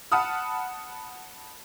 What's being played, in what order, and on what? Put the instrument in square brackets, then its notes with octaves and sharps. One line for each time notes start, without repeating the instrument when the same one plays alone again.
[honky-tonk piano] F#5 A5 B5 D#6 F6